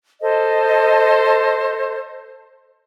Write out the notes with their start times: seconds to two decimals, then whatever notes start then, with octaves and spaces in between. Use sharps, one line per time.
0.21 A4 C5 D#5